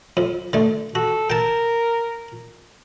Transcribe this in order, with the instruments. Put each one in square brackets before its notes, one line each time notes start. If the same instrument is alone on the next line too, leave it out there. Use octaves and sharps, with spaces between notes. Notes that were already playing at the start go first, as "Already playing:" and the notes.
[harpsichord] F2
D3 A3
[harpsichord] F#4 [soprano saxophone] A4
[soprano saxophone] A#4 [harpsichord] G5 A5